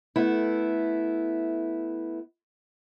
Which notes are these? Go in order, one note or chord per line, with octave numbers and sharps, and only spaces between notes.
A3 B3 E4